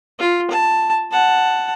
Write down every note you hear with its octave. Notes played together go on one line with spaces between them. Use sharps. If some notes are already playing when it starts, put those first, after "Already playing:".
F4
A5
F#5 A5